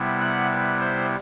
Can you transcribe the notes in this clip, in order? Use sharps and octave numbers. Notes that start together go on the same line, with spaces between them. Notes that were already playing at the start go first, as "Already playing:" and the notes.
Already playing: C3 G3 B3 E4
F#5
B4
C5